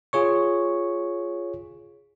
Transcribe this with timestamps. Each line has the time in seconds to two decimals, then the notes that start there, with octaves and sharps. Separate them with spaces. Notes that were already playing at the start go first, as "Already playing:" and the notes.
0.13 F4 G#4 C#5 C#6